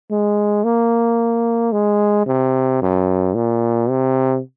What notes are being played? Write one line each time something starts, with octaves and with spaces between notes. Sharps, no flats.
G#3
A#3
G#3
C3
F#2
A#2
C3